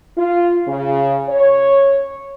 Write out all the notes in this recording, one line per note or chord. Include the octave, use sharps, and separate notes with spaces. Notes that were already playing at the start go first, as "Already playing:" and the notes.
F4
C#3
C#5